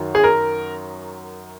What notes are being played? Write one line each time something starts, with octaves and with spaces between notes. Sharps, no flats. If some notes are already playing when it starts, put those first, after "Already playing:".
Already playing: F#2 D#3 F#3
G#4
A#4